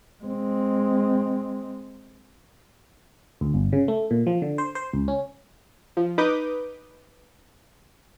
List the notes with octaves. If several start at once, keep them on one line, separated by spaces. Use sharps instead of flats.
G#3 C4
D2
G1
C#3
A3
A#2
F3
D3
C5
C5
C#2
C#4
F3
D#4 B4 D6 D#6 G6